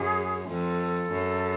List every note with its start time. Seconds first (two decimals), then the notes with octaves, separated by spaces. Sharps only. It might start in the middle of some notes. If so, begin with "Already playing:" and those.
Already playing: F#2 G#4
0.48 F2 A4
1.12 F#2